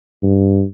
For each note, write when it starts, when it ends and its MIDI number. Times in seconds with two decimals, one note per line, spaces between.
0.23 0.64 43